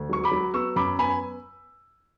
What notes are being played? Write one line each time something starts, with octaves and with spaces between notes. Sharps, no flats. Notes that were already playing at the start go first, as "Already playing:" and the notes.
Already playing: D2
F#3 C#6
B5 D6
F#3
B3 C#6 E6
F#2 B5 D6
B3 G#5 B5